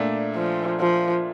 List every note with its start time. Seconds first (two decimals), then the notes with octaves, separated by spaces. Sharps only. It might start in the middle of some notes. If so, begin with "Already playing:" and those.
Already playing: A#2 A3 D4
0.35 F3
0.80 F3